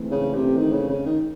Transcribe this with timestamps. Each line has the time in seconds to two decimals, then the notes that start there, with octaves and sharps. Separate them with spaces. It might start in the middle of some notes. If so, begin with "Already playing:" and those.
Already playing: G#2 E3 A3 C4
0.11 C#3
0.34 C3
0.56 D#3
0.73 C#3
0.89 C#3
1.06 D#3